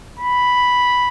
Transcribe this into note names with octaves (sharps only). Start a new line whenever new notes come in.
B5